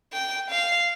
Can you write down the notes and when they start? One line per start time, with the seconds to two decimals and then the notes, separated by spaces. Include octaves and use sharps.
0.13 G5
0.50 F5